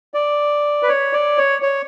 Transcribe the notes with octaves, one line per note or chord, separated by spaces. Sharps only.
D5
B4
C#5
D5
C#5
C#5